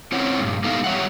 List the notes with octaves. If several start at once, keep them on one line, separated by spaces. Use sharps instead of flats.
C4 C#4 E4 C#5 F#5
G2 A#2
G3 B3 D#4 E4 A4 F5
G3 C#5 E5 F#5